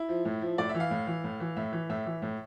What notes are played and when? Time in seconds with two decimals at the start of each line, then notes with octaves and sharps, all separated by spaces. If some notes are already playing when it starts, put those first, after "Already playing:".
Already playing: E4
0.09 F3
0.25 A2
0.41 F3
0.58 A2 D5
0.69 E5
0.74 E3
0.80 F5
0.91 A2
1.07 E3
1.24 A2
1.40 E3
1.57 A2 E5
1.73 E3
1.89 A2 E5
2.06 E3
2.22 A2